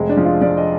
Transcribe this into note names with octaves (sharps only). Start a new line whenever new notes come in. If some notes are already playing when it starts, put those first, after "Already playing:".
Already playing: F1 G#3
D4
F3
F4
F3 D5
D#5